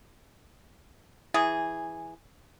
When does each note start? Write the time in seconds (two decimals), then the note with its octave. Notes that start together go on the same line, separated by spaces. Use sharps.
1.34 E3 G#4